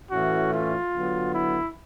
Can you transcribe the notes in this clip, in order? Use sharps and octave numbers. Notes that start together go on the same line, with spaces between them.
A2 E3 A3 C#4 F#4
F4
D3 F#3 B3
E4